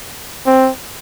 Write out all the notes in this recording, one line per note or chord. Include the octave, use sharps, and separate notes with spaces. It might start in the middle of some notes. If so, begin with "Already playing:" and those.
C4